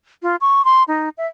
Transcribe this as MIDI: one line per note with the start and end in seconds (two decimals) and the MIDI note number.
0.23 0.36 65
0.41 0.64 85
0.65 0.83 84
0.88 1.09 63
1.18 1.27 76